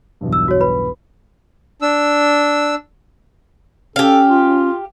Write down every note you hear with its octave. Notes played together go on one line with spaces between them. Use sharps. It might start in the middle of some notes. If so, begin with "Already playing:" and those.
B1 E2 G2
E6
F#4 C#5
B4 B5
D4 E6
C#4 G4 A4 F5
F4